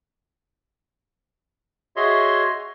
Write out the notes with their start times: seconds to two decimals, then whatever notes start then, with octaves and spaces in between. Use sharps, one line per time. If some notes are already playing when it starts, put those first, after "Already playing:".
1.96 F#4 G#4 C#5 D#5 E5 C6